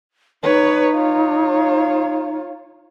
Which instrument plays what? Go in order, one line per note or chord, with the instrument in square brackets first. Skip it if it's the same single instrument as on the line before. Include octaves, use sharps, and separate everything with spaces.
[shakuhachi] D#4 [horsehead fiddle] B4 C#5
[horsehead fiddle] F4 C#5